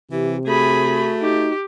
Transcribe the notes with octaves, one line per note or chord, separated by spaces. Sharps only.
C3 E3 G4
A3 F#4 G#4 B5
D#4 G4